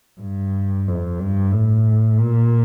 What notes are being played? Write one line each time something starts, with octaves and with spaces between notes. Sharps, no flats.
G2
F2
G2
A2
A#2